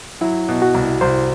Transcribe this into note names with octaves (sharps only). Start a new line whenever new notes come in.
F#3 E4
B2
F#4
C2
C2 C5